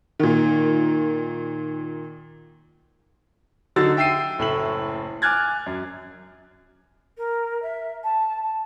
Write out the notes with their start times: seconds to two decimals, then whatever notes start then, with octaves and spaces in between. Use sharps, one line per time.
0.19 A#2 D#3
3.76 D3 F#3 D#4 F#4 E6 A6
3.97 E5 G5 E6 C7 D#7
4.39 F#1 A2 A3 E6 F#7
5.22 G#5 D6 F6 F#6 G#6 A6
5.66 F#2
7.18 A#4
7.63 E5
8.04 A5
8.43 A5